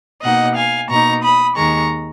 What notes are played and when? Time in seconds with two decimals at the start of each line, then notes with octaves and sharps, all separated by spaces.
0.23 B2 A#3 D#4 D#5 F#5
0.56 F5 G#5
0.89 B2 A#3 D#4 A#5 C#6
1.23 B5 D#6
1.56 D#2 D#3 G#3 A#5 C#6